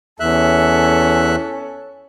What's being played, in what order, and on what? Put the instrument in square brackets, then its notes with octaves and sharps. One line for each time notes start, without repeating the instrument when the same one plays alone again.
[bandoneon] E2 E5 F#6 [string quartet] C#4 A4